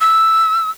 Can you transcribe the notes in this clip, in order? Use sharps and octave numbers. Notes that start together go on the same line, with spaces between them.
E6